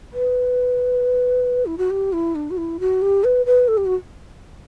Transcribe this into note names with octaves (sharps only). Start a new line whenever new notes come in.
B4
E4
F#4
G4
E4
D4
F#4
E4
F#4
G4
B4
B4
A4
G4
F#4